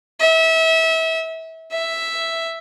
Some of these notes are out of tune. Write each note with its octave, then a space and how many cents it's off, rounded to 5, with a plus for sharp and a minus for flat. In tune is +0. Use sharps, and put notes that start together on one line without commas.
E5 -30
E5 +0